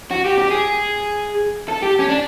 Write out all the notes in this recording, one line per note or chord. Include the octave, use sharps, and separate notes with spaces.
F#4
G4
G4
G#4
A4
G4
C#4
D4